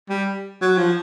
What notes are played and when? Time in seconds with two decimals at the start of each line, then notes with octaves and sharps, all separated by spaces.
0.09 G3
0.61 F#3
0.78 F3